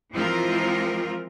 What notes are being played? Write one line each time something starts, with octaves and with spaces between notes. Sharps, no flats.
E3 F3 G#3 C4 F4 A#4